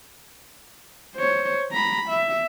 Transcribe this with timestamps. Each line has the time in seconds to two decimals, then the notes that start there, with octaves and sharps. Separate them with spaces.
1.16 C5 C#5
1.72 A#5 B5
2.09 E5